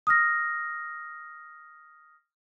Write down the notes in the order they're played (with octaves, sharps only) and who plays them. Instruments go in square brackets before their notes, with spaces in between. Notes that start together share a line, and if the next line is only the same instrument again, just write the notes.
[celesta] D#6 F6 A#6